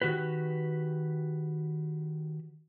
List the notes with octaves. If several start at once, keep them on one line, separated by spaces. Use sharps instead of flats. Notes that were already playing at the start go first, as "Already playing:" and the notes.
D#3 F#4 G4 B4